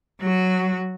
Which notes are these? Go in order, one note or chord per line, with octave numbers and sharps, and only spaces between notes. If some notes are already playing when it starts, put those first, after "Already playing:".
F#3 F#4